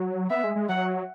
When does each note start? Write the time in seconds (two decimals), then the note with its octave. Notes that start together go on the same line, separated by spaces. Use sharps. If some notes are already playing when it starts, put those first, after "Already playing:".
Already playing: F#3
0.30 B3 E5
0.44 G#3
0.56 G#3
0.69 F#3 F#5